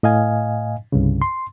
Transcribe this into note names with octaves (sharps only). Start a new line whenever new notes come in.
A2 D#5 F5 G#5
C2 G2 C#3
C6